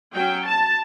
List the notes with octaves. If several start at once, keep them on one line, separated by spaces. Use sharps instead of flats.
F#3 C#4 G5
A5